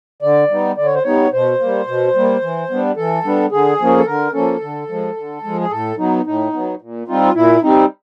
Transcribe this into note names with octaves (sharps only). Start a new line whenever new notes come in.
D3 D5
G3 B3 D#4
D3 D5
C#5
C5
G3 B3 D#4 C#5
B2 C5
G3 A#3
B2
G3 A#3
E3
G3 B3 D4
E3 A4
G3 B3 D4
D3 G#4
F3 A#3 C#4
A4
D3 A#4
F3 A#3 C#4 A4
D3
F3 G#3
D3
F3 G#3
G#4
A2 A4
F#3 B3 D#4
A2 D#4
F#3 B3
A#2
G3 C4 D#4 F4
A#2 E4
G3 C4 D#4